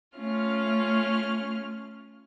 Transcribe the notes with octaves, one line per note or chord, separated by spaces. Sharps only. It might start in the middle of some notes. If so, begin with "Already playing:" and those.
A3 C#4 F4 F6